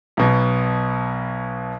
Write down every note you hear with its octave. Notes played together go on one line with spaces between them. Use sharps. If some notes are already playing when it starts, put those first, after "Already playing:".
B1 B2